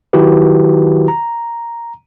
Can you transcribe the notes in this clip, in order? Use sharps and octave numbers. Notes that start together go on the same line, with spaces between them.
D#3 F#3 E4 F#4 G4 B4
A#5